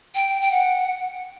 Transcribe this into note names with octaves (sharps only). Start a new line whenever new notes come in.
G5
G5
F#5